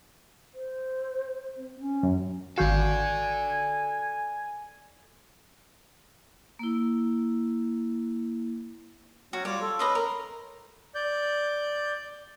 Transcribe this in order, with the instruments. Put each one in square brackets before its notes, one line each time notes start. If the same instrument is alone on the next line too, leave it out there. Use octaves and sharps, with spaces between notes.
[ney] C5
C4
C#4
[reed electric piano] F#2
[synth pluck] G#1 F5 [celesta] F#4 C#6 G6 [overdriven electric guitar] A4 D5 [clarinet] G#5
[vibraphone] A#3 E4
[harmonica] F#3 C#4 [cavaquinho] F#4
[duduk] G3 [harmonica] F4 D5 [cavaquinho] C#5
[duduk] A4 [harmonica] C6
[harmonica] C#4 [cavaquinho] B4 D#5 F5
[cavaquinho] A#4
[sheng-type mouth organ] D5 G6